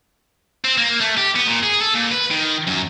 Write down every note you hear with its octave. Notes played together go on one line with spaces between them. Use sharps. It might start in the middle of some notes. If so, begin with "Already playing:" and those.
C4
A#3
A3
G4
B3
A#2
G#4
A4
A#2
B4
D#3
F#2